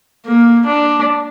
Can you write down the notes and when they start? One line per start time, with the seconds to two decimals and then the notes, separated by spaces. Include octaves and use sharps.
0.26 A#3
0.66 D4